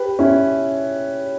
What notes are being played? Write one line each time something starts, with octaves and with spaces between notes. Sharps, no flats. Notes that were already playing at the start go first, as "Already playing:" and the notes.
Already playing: G4 B4
C#4 E4